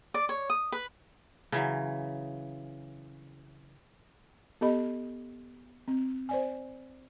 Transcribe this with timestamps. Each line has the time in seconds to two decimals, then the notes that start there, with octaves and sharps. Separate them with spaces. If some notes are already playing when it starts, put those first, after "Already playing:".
0.14 D5
0.29 C#5
0.50 D#6
0.72 B4
1.52 C#3 E3 F#3
4.61 B3 G4 A4 D#5 B5
5.88 C4
6.29 C5 D5 G#5